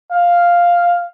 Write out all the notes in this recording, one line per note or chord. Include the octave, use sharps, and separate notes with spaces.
F5